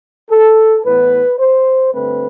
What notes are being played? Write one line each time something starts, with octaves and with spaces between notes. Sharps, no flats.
A4
A2 E3 B3 B4
C5
G2 D3 A3 C4 B4